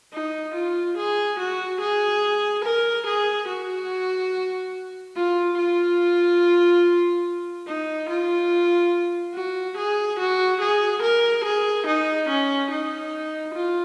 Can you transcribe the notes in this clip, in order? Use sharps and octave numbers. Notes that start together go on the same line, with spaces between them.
D#4
F4
G#4
F#4
G#4
A#4
G#4
F#4
F4
F4
D#4
F4
F#4
G#4
F#4
G#4
A#4
G#4
D#4
C#4
D#4
F4